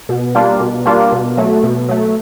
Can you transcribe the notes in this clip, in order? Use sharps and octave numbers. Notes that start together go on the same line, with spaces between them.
B2
G3 A#3 D4 F4
B2
G3 A#3 D4 F4
B2
F#3 A3
B2
F#3 A3